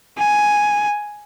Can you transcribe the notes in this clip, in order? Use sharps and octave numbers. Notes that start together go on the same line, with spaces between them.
G#5